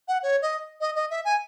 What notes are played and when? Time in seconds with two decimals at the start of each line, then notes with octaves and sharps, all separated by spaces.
0.08 F#5
0.23 C#5
0.42 D#5
0.81 D#5
0.96 D#5
1.10 E5
1.25 G#5